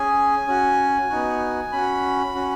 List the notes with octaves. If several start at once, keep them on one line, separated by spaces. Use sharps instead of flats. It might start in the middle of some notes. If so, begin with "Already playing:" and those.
Already playing: C#4 G#4 G#5
C#4 F#4
B3 D#4 F#4
C#4 F#4 B5
C#4 F#4